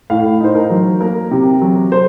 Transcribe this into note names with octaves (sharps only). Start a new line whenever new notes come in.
A2 F5
D#4 C5
A#4
F#3
A#3 A#4
C3
F#3
C5